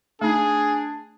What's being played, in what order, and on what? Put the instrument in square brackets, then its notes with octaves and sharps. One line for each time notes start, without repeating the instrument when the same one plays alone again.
[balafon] A3 D#4 [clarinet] D4 [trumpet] G#4